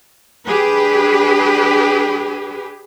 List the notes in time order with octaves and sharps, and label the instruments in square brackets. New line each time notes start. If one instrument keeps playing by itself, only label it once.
[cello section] D4 G4 G#4 B4